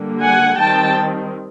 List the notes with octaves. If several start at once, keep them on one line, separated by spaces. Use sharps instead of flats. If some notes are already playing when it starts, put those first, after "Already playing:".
Already playing: D3 G3 A#3
F#5 G#5
D#3 G3 C4 G5 A5